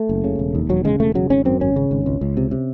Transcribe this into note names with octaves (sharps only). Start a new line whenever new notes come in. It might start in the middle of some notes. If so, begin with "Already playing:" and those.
Already playing: A3
F#1
C#3
E1
D#2
E1 F#3
C#3 G#3
E1 A3
C#3 F#3
G#1 C#4
F#2 C4
G#1 C#4
C#3
G#1
C#2
C#2
C3
C3